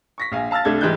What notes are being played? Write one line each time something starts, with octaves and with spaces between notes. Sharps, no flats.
C#6 A#6 B6
A#1 F5 G#5
F5 A5 E6 F6 A6
C2 A3 D4 A4 G#6
G#2 E3 G3 G#3 F#6 G6